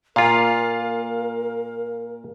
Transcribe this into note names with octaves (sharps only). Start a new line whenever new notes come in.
A#2 F4 A#4 F5